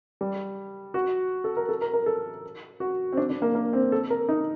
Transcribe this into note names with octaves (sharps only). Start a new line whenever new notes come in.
G3
F#4
A4
A#4
A4
A#4
A#4
A4
F#4
C4
D4
D4
A#3
A#3
C4
A4
A#4
D#4